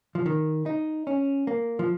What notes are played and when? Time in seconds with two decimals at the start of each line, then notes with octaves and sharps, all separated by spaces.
0.15 F3
0.26 D#3
0.66 D#4
1.07 C#4
1.47 A#3
1.79 F3